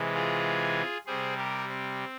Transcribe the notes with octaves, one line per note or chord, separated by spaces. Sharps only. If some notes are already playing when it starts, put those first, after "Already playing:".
Already playing: C3 E3 G#3
F4 G#4
C3 G3 G#4 C5
G4 A#4
C4